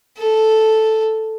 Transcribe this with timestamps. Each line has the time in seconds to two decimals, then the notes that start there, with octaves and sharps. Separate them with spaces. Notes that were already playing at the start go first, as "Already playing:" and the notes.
0.18 A4